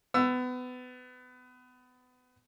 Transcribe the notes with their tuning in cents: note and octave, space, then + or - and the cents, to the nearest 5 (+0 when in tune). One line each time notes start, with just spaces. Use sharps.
B3 +25 E6 +10